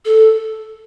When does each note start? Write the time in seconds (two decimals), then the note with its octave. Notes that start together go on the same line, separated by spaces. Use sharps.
0.05 A4